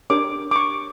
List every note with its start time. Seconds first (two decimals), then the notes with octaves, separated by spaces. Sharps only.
0.10 D4 G4 A#4 C#5 D6
0.51 D6
0.56 C#6